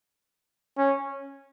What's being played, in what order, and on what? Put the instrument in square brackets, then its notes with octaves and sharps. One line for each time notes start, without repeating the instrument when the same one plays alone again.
[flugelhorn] C#4